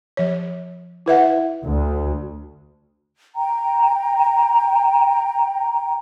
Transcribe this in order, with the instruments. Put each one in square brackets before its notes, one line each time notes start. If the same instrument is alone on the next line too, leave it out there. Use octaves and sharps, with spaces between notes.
[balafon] F3 C#5
E4 B4 E5 F#5
[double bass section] D2
[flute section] G5 A#5